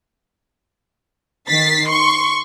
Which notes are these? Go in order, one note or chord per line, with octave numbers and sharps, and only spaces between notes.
D#3 A6 B6 C7
C6 C#6